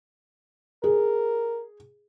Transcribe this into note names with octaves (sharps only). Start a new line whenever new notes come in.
G#4 A#4